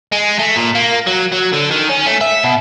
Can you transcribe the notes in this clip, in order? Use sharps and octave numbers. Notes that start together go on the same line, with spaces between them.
G#3
A3
A#2
A#3
F#3
F#3
D3
D#3
C#4
A3
E5
B2